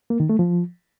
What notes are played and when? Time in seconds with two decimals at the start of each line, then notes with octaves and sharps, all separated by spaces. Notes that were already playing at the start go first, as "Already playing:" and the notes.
0.10 A#3
0.20 D#3
0.29 A3
0.39 F3